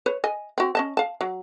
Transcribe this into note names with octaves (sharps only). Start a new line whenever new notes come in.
B4 C#5
D#5 G#5
C4 F#4
C#4 D#5 A5
F5 A5
F#3